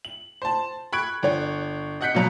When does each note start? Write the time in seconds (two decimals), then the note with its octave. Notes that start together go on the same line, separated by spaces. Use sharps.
0.05 F#7
0.42 C5 A5
0.93 B5 C#6 F#6 G#6 D7
1.23 G1 C#5
2.01 D#5 F#5 F#6 G6 B6 C#7
2.15 B2 F3 F#3 A#5